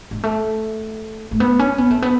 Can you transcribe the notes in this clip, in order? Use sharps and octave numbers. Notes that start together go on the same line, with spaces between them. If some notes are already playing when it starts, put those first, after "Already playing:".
G#3
A3
A3
B3
C#4
B3
A3
B3